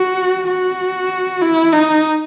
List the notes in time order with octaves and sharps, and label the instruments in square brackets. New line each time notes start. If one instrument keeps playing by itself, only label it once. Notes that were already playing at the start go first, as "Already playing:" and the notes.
Already playing: [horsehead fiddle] F#4
F#4
E4
D#4